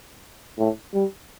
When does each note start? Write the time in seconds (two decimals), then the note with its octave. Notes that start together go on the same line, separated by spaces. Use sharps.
0.58 A2
0.94 G3